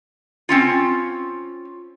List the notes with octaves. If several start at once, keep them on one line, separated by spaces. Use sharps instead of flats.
C4 C#4 F4